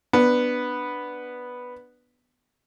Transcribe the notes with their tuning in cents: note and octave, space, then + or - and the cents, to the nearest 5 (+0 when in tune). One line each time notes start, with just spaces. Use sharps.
B3 +0 D4 +5